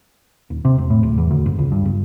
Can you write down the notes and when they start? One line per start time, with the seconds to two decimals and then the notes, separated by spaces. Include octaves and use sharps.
0.50 D#1
0.65 C3
0.78 E1
0.90 A2
1.03 D1
1.18 E2
1.31 D2
1.46 F#1
1.59 C#2
1.72 G2
1.85 G1